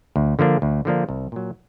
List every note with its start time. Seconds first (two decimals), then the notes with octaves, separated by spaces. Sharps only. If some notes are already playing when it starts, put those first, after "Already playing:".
0.16 D2
0.39 D3 F3 A#3 D4
0.62 D2
0.85 D3 F3 A#3 D4
1.09 C2
1.32 A#2 F#3